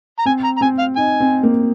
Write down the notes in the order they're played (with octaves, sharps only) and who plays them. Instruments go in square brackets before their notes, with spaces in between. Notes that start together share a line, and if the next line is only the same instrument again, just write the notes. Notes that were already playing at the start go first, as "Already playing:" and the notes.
[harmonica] A#5
[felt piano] C4 [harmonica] G#5
[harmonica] A#5
A#5
[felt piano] C4 [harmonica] G#5
[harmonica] F5
[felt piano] D#4 [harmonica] G#5
[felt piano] C4
A#3